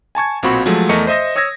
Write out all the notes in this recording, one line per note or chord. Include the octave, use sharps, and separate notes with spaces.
G#5 A5 C#6 G#6
B1 A#2 C4 F#4 B5 C#6
F3 F#3 G#3 A3
E2 A3 A#4 D#5 C#6 C#7
C5 D#5 E5 D#6 A#6
C#5 D#6 E6 G#6 A#6